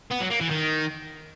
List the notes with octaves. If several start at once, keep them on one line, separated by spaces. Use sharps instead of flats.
B3
F#3
A#3
E3
D#3